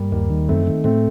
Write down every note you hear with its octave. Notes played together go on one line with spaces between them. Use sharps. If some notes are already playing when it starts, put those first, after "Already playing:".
Already playing: G2 G3 A#3
D#2 G3 A#3
D#3
F#2 A3 C4
D#3
A2 A3 C4